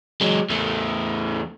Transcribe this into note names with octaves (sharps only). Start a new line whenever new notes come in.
F#3 G#3
E2 A3